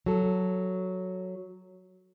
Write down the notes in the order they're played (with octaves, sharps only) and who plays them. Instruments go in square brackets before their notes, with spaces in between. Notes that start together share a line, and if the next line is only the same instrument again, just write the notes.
[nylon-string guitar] F#3 A4